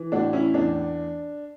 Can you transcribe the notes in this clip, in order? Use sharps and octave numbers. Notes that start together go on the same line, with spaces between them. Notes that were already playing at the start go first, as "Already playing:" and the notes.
Already playing: E3
A2 D4 F#4
C#4 E4
E2 D4